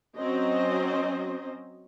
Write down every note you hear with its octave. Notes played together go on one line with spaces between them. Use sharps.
F#3 C4 C#4 C5 D#5